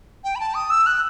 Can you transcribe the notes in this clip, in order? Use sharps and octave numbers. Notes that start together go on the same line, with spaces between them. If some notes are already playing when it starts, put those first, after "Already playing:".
G5
B5
A5
D#6
E6
F#6